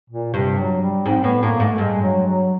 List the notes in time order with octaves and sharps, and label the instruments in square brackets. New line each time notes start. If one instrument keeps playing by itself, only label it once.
[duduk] A#2
[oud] G2 [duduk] C3
[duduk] F#3
G3
[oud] G#2 [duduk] C4
[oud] A2 [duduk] B3
[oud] A2 [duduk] A#3
[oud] G#2 [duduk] A3
[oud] G2 [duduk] G#3
[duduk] F#3
F#3